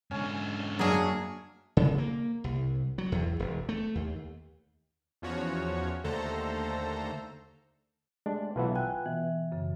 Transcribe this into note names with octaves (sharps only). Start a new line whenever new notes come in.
G#2 D3 C#4
F#2 F#3 A#3 C#4 D4 G#4
C#3
A#3
C2
F#3
E2
E1
A3
D#2
E2 F3 C#4 F#4 C#5
D#2 D3 A3 A4 C5 A#5
G#3 A3 D4 G4
B1 E3 F4 B4 E5 F#5
G5 G#5 F#6
B2 E3
F#2 C#3